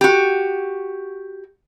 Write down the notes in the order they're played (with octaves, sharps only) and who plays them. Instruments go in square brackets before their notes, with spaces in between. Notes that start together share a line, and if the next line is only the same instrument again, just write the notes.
[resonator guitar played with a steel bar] F#4 G4